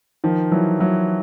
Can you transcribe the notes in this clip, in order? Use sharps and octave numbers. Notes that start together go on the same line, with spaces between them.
D#3 F3
E3 F#3
E3 F#3